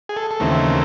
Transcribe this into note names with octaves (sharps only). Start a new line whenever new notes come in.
G#4
A4
A4
D#2 C#3 E3 A3 C4 A#4